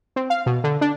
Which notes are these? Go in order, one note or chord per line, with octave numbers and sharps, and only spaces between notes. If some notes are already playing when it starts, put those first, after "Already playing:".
C4
F5
B2
D3
D4